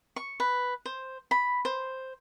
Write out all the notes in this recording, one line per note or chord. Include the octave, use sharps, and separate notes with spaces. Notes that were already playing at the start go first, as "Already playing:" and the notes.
C#6
B4
C5
B5
C5